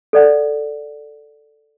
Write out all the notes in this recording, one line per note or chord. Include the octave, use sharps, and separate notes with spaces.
A4 D5 F#5